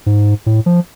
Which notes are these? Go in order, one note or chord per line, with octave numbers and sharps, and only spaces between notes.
G#2
A2
F3